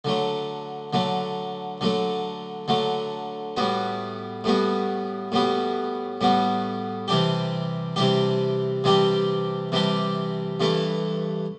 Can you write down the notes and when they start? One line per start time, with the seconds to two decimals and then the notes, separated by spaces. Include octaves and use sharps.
0.05 D3 F#3 A3
0.93 D3 F#3 A3
1.81 D3 F#3 A3
2.68 D3 F#3 A3
3.57 A2 G3 B3 F#4
4.44 A2 G3 B3 F#4
5.32 A2 G3 B3 F#4
6.21 A2 G3 B3 F#4
7.08 C3 E3 G3 D4 G4
7.96 C3 E3 G3 D4 G4
8.84 C3 E3 G3 D4 G4
9.72 C3 E3 G3 D4 G4
10.60 G2 E3 A3 E4 A4